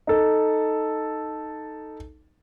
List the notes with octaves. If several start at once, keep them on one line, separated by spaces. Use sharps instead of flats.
D#4 A4